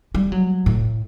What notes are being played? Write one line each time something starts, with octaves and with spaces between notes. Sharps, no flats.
G3
F#3
A2